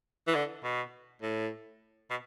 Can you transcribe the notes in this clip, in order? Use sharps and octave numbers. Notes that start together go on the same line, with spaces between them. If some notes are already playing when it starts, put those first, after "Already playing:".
E3
D3
B2
A2
B2